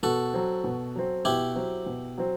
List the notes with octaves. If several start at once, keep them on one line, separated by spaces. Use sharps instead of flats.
B2 F#4 A4
F#3 C4
B2
F#3 C4
B2 E4 G4
F#3 C4
B2
F#3 C4